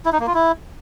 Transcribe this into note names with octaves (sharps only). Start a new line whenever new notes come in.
E4
D#4
A#3
F4
E4